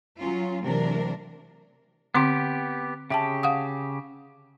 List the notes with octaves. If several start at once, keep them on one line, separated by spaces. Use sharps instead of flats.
F#3 C#4 F4
C3 E3 F#3 A3 D4 A#4
D3 B3 C4 G4 C6
C#3 G4 E5 G5 A5
F5 F#5 D#6